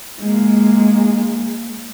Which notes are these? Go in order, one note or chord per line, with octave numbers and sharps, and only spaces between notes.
G#3 A#3